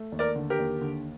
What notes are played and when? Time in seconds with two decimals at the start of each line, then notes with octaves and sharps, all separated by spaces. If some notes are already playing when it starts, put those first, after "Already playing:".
Already playing: A3
0.12 D#2
0.19 A#4 D5
0.36 D3
0.50 G4 A#4
0.59 D#2
0.81 D3